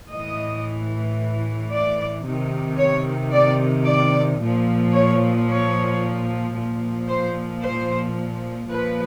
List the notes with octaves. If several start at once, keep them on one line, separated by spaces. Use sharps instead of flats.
A2 E3 D#5
D5
C3 D#3
C#5
D5
D5
A#2 F3
C#5
C#5
A#2 F3
C5
C5
A#2 F3 B4